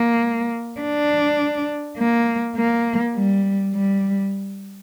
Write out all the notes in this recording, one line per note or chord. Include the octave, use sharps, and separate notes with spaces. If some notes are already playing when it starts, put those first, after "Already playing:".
Already playing: A#3
D4
A#3
A#3
G3
G3